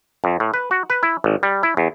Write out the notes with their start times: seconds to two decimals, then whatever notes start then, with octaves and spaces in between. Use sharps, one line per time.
0.24 F2
0.40 A2
0.54 B4
0.71 F#4
0.90 B4
1.03 E4
1.24 G#1
1.43 G3
1.63 E4
1.77 E2